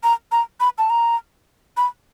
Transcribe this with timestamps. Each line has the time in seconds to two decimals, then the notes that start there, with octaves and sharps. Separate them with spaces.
0.04 A#5
0.32 A#5
0.60 B5
0.78 A5
0.90 A#5
1.77 B5